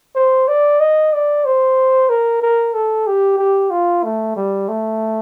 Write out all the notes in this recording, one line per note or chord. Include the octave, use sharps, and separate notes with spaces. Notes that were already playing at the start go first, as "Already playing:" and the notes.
C5
D5
D#5
D5
C5
A#4
A#4
A4
G4
G4
F4
A3
G3
A3